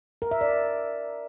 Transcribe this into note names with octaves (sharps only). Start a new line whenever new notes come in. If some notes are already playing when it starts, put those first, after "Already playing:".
A#4
E5
D5